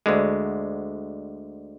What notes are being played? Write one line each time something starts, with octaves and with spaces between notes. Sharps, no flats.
D2 D3 G#3